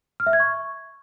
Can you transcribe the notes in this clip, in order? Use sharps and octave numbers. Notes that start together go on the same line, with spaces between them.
F6
E5
G#6
C#6